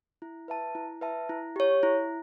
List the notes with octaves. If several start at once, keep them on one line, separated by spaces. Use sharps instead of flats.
E4
B4 E5 A5
E4
B4 E5 A5
E4
G4 C#5
E4